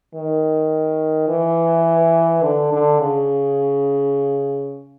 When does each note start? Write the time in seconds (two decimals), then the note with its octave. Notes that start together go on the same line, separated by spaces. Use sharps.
0.15 D#3
1.29 E3
2.43 D3
2.73 D3
3.00 C#3